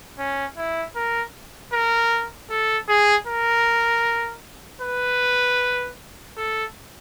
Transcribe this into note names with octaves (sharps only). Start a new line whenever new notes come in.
C#4
E4
A#4
A#4
A4
G#4
A#4
B4
A4